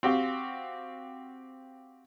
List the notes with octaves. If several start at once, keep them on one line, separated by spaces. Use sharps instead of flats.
C4 F#4 G4 F5